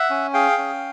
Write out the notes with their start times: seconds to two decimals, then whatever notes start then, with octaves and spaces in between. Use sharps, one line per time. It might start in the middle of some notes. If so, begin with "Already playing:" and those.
Already playing: E5 F#5
0.10 C#4
0.34 G#4 F5 G5
0.58 C#4